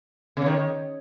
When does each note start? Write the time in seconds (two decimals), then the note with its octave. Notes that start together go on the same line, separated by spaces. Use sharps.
0.37 C#3
0.46 D#3